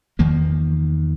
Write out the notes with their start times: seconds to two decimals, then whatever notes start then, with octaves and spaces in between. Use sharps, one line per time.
0.19 E2 D#3 F3 A#3